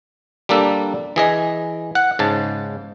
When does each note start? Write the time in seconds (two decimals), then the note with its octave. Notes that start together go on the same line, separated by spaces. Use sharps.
0.49 G3 A#3 D4 A4
1.16 E3 G#4 D#5
1.95 F#5
2.19 G#2 C#3 A5